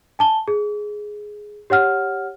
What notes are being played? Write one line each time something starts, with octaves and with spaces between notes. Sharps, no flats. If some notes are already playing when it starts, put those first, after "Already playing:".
G#5 A5 G7
G#4
G4 C#5 F#5 F6